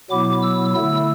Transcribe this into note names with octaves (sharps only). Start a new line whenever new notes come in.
B2 F#3 B3 E4 D6
E6
D3 A3 E4 E6